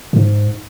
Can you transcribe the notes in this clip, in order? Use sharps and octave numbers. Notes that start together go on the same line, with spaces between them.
G#2